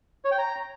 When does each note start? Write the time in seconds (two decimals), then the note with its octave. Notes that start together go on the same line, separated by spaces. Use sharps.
0.25 C#5
0.32 G5
0.38 A#5